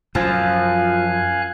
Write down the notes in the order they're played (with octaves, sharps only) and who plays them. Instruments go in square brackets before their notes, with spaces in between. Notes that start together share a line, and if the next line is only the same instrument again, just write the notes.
[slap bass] F#2 [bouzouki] F3 [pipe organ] F5 G#5 F#6